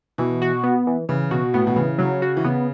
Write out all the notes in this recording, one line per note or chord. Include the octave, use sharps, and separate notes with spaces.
B2 E3
F#4
B3
E3
C#3 E3
B2 F#4
A2 B3
B2
C#3 E3
C#3 F#3
F#4
E3
C#3 B3